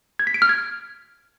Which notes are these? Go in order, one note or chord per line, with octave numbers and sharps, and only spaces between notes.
G#6
B6
D7
F6
G#6